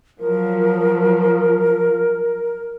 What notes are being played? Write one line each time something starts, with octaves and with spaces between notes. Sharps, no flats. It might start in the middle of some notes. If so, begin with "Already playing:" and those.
F3 F#3 A#4